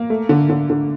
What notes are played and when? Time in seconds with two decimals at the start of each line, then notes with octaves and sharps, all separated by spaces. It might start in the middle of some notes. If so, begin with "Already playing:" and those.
Already playing: A#3
0.10 A3
0.29 D3
0.50 D3
0.70 D3